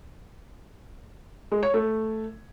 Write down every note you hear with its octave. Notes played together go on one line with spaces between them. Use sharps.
G#3
C#5
A3